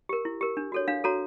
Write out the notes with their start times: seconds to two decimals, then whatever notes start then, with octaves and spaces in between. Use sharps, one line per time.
0.09 G4 A#4
0.25 E4
0.41 G4 A#4
0.57 D4
0.72 F#4 A4 C#5
0.88 D4 F5
1.04 F#4 A4 C#5 A#5